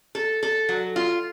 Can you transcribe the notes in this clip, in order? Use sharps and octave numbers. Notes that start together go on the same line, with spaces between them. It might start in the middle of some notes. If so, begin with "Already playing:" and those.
A4
A4
F#3
F4